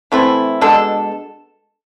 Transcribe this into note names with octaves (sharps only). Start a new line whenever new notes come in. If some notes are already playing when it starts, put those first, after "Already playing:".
E3 A3 C4 E4
B2 G#3 D4 A4